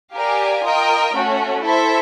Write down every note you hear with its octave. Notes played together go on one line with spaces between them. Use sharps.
G4 A#4 D5 F5 G#5
F4 A#4 D#5 G5
A3 C#4 F#4
E4 A4 C5 E5